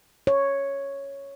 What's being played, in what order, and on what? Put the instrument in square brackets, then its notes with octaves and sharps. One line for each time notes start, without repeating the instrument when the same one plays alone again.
[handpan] C#5